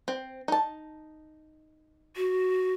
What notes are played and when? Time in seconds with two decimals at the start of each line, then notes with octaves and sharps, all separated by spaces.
0.08 C4
0.48 D#4 A5
2.17 F#4